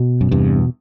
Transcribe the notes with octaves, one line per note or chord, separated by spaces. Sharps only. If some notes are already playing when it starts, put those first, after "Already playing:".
Already playing: B2
F#2
E2 G2 C3
B2